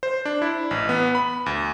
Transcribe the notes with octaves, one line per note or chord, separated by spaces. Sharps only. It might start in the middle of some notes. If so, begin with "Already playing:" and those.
C5
D4
E4
A1
B3
B5
D2